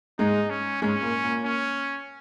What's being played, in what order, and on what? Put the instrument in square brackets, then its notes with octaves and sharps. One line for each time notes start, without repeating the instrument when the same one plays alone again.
[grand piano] G#2 G#3 [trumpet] D#4
[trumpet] C#4
[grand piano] G#2 G#3 [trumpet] C#4
[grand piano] A#2 A#3
A#2 A#3
[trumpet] C#4